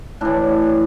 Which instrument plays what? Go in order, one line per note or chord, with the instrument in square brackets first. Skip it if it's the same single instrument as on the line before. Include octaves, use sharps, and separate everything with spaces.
[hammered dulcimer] A2 E3 D4